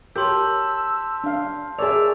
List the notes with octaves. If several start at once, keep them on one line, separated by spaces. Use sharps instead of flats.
G4 A#4 C#5 A5 C6 E6 G6
D4 F5
G#4 A#4 C#5 D5 E5 E6 F7